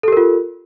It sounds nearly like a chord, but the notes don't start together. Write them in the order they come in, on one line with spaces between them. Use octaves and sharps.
A4 G4 A#4 F4